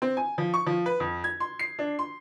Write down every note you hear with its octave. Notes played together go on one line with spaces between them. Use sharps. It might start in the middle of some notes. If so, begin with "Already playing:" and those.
C4
G#5
F3
C#6
F3
B4
F2
G#6
C6
C7
D4
C6